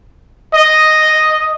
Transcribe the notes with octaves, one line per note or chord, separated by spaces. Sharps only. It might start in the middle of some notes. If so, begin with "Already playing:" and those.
D#5